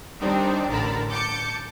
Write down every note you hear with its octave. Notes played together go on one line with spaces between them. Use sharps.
D#3 G3 C4 D4 D#4
A1 D3 A#4 A5 B5
A5 D6 G6 C#7